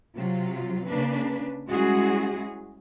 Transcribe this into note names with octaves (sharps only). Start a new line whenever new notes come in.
C3 F#3 F4
C#3 A#3 D4 B4
G3 G#3 C#4 E4 F#4 G#4